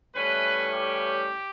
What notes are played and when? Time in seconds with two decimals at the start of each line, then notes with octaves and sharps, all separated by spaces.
0.15 A2 E3 G3 C#4 B4
0.73 G4